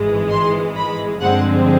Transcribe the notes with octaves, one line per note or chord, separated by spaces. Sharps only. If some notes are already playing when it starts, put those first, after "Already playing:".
Already playing: G#1 G#2 E3 G#3
C6
B5
G2 D3 F3 G#3 C4 F#5